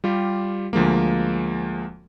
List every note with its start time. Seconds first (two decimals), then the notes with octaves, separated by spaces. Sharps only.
0.04 G3 F4 G4
0.73 D2 F3 G#3 A#3